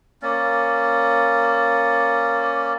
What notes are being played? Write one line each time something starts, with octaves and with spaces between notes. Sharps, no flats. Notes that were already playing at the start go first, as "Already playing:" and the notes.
A#3 C#4 D5